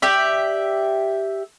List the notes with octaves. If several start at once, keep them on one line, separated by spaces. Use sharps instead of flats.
G4 D5 E5